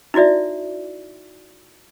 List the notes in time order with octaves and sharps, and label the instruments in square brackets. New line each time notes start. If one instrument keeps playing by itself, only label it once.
[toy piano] D#4 E4 F#4 D5 E5